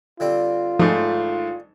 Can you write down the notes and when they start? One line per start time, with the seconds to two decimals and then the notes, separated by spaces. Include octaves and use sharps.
0.20 D3 G3 C4 F4
0.79 G#1 G#2 F3 A3 D#4